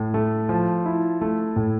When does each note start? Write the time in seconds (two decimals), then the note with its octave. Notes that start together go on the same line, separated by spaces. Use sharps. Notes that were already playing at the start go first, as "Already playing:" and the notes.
Already playing: A2
0.14 A3
0.49 F3
0.86 E4
1.21 A3
1.56 A2